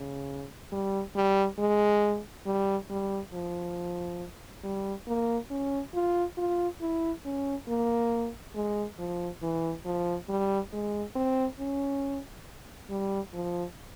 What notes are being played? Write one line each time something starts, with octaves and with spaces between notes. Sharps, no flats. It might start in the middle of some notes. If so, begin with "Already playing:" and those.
Already playing: C#3
G3
G3
G#3
G3
G3
F3
G3
A#3
C#4
F4
F4
E4
C#4
A#3
G#3
F3
E3
F3
G3
G#3
C4
C#4
G3
F3